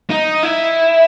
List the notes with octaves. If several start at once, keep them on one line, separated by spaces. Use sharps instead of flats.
D#4
E4